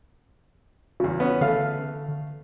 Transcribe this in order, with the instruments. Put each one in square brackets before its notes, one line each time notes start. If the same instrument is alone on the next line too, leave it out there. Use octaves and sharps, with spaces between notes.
[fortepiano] E2 C#3 [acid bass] F#4
[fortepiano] B3 C#4
[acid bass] D3 [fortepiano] A3 F5 F6